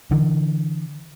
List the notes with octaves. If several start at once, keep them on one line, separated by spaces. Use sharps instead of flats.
D3 E3